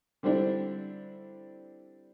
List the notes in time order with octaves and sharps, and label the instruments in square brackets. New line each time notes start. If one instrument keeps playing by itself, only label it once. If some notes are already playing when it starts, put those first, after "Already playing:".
[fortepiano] D3 G3 C4 D4 E4